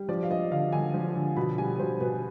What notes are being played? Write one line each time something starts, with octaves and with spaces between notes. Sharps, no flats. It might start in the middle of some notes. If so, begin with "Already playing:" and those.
Already playing: G3
F3 D5
F5
F3 D#5
D3 F5
D3 G#5
F3
D3
B2 B5
G3 G#5
B2 C5
B2 B4